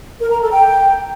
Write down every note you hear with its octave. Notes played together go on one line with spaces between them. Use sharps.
A#4
A#5
A4
G5